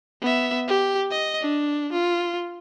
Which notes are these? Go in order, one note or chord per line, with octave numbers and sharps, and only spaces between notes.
B3 E5
G4
D#5
D4
F4